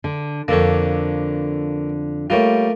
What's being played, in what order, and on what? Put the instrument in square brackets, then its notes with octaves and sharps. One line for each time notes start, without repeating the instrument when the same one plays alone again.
[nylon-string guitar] D3
[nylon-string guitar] F2 D3 [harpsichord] A#3 A4 C#5
[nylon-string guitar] G3 C#5 [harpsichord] A3 A#3 F4